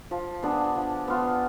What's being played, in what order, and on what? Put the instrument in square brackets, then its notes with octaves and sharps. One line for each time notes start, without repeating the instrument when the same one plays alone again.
[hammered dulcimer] F3
B3 D4 G#4
F3
B3 F4